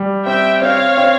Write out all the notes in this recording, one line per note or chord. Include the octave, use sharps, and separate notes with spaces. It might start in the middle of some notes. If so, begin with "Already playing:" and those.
Already playing: G3
C4 E5 G5
C4 C#5 F5
C4